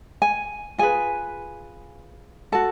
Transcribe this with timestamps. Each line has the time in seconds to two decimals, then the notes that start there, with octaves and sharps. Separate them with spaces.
0.22 G#5
0.78 F4 G#4 B4 G#5
2.52 F#4 A4 A5